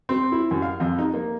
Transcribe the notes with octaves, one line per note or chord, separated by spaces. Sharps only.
C4
E4
F#2
F5
F2
D#4
A#3